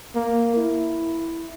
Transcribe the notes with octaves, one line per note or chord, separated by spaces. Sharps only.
A#3
E4